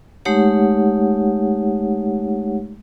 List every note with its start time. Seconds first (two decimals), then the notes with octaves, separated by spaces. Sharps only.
0.25 G#3 A3 D#4 G4 C#5 F#5